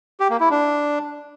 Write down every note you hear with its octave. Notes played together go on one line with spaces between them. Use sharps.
G4
A#3
E4
D4